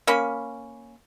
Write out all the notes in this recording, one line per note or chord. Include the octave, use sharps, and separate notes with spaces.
A#3 C#4 B5